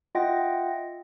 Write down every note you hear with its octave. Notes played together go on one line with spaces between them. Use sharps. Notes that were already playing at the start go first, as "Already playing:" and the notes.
F4 D#5 E5 F#5 G5 A#6